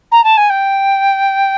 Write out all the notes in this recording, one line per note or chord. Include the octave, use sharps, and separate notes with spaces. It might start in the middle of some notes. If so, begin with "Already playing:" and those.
A#5
A5
G#5
G5